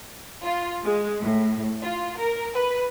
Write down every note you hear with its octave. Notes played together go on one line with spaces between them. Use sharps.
F4
G#3
A2
F4
A#4
B4